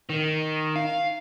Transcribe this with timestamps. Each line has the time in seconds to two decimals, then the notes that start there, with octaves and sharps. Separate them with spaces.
0.09 D#3
0.76 F5